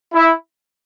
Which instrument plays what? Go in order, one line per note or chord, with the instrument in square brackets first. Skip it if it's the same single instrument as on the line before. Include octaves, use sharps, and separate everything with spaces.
[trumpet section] E4